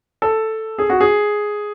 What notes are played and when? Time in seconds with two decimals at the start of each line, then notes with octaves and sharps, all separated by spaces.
0.22 A4
0.78 G#4
0.90 F#4
1.00 G#4